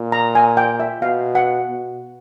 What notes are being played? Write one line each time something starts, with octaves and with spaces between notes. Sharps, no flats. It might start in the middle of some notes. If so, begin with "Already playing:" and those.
Already playing: A#2
A#5
G#5
G5
E5
B2 F5
F#5
B2